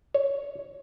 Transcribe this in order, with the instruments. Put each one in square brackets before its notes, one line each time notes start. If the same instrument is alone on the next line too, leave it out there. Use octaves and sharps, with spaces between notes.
[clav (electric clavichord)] C#5